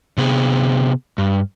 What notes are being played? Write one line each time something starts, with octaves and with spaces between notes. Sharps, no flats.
C3 B3 G#4
G2